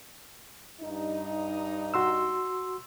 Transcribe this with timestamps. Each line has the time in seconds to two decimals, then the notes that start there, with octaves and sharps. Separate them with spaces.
0.81 G2 D#4
1.94 F#4 C6 E6